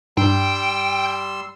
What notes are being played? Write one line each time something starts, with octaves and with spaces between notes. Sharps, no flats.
G2 G3 G5 C6 E6